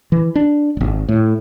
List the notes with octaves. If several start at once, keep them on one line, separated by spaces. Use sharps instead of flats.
E3
D4
D1 G#1
A2